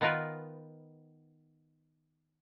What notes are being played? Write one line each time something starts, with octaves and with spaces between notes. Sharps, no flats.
D#3 B3 D#4 F4 A#4 B4